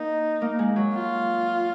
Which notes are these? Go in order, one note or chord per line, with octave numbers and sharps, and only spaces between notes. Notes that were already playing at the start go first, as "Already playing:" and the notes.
Already playing: A#3 D#4
A#3
G#3
F#3
F4